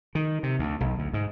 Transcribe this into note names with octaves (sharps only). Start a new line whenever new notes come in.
D#3
C3
D2
B1
D2
G#2